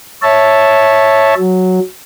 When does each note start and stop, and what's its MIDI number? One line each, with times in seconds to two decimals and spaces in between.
0.22 1.34 73
0.22 1.34 76
0.22 1.34 81
1.37 1.79 54